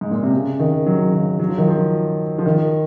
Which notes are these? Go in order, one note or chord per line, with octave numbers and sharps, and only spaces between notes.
G#2
A#2
C3
C#3
D#3
F#3
D#3
F#3
F3
D#3
F3
F3
D#3